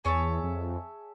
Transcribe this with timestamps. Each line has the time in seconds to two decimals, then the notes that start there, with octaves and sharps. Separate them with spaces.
0.05 E2 G#4 C#5 E5 A5
0.43 F2